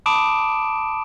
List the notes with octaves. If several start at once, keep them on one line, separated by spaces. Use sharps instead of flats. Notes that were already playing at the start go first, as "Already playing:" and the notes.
A5 B5 D6 D#6 D7 E7